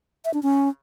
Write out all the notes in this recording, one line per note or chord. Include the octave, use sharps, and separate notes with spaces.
E5
D4
C#4